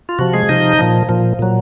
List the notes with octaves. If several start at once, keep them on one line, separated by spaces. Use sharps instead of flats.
F4
C3 F3 F#4
G#3 G#4
C3 F3 D#4 D#5
A#2 F3
A#2 F3
A#2 F#3